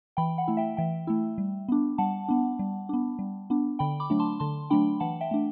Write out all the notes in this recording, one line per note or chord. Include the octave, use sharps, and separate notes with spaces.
E3 G5 B5
F#5
A3 E4
E5 G5
E3 E5 G5
A3 E4
G3
B3 D4
G3 F#5 A5
B3 D4
G3
B3 D4
G3
B3 D4
D3 G5 B5
B5 D6
F#3 A3 D4
A5 C6
D3 A5 C6
F#3 A3 D4 G5 B5
E3 F#5 A5
E5 G5
A3 D4